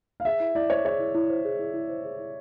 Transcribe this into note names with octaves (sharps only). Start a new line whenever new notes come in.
F5
G#4 E5
E4
E4 D5
C5 C#5
G#4 C#5
E4
E4
C5
G#4
E4
E4
C5
G#4
E4